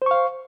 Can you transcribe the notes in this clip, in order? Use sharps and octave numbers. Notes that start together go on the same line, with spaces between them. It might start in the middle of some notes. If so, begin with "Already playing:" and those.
C5 F5 C#6